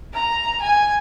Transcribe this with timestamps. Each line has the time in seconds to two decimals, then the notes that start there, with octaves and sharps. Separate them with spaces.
0.14 A#5
0.62 G#5